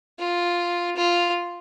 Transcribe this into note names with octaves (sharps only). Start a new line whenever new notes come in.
F4
F4